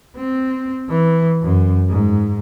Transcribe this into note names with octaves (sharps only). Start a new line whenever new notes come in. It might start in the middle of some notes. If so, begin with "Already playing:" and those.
C4
E3
F#2
G#2